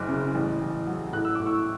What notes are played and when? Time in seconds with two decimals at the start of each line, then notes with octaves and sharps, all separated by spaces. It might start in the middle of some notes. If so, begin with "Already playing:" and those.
Already playing: F#1 F#2 D6 F#6
0.09 C#3
0.35 A1
0.61 A1
0.87 F#3
1.13 A2 F#6
1.25 E6
1.35 A2 D6
1.46 C#6 E6